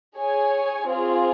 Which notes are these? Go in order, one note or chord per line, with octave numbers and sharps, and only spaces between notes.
G#4 C#5 G#5
C4 F4 G#4